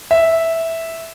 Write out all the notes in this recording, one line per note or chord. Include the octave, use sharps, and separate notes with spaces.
E5